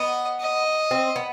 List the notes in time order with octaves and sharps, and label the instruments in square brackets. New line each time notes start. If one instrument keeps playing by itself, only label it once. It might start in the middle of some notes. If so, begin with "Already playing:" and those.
Already playing: [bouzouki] B3 [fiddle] D#5
[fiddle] D#5
[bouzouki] C4
B3